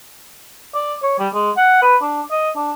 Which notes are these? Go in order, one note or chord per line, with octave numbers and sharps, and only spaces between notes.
D5
C#5
G3
G#3
F#5
B4
D4
D#5
D4